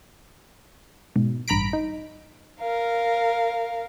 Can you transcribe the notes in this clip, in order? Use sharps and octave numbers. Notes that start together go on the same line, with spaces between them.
G#2 B2
A1 G2 A#5 B5 B6 D7
D#4
A#4 F5